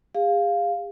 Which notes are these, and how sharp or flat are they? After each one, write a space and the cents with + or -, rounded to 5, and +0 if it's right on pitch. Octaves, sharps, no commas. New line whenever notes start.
G#4 -40 F5 +0